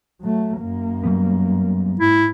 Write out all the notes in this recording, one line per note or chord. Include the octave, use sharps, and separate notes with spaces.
F#3 A3
F#2 A#3
F#3 G3 B3
G#2 E4